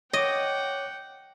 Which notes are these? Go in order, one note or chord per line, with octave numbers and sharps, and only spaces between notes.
C#5 D#5 F#5 G5 D6